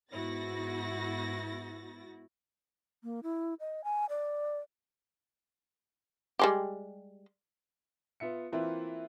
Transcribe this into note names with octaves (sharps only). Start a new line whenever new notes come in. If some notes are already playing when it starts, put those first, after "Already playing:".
G#2 B3 E4 F#4 A6 A#6
A#3
E4
D#5
G#5
D5
G3 G#3 G4
B3 F4 E5 C#7
E3 A#3 C4 E4 F4 B4